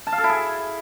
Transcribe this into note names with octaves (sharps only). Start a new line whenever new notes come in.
A5
F5
A4
E4
G#4